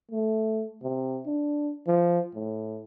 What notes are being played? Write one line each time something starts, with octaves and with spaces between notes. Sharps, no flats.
A3
C3
D4
F3
A2